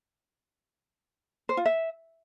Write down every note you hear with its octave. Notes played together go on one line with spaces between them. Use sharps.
C5
F4
E5